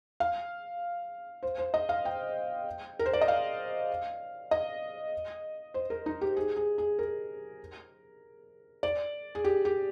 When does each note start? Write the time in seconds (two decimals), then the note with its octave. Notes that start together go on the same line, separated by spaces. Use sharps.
0.20 F5
1.43 C5
1.58 C5
1.74 D#5
1.89 F5
2.05 G5
2.99 A#4
3.06 C5
3.13 D5
3.21 D#5
3.28 F5
4.51 D#5
5.74 C5
5.90 A#4
6.06 D#4
6.21 G4
6.37 G#4
6.57 G#4
6.78 G#4
6.99 A#4
8.83 D5
9.35 G#4
9.44 G4
9.65 G4